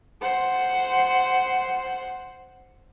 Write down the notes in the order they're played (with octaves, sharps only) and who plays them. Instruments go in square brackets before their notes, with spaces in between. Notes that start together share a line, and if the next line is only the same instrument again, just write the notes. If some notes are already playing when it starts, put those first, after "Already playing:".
[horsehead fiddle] C5 F#5